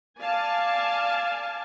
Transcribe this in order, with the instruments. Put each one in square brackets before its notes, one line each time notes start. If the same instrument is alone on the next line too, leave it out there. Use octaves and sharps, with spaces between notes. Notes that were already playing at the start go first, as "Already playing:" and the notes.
[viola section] D5 F5 G#5 A5